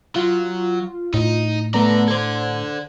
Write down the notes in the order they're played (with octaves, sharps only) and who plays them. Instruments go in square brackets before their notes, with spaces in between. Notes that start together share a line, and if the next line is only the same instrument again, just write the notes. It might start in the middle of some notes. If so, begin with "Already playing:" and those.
[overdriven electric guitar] F#3 [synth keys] F4
[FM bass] A2 [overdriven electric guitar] D#4
[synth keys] A3 B3 A#5 [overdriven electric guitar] A4 D5
[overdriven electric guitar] A4 D5 [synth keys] C5 G#6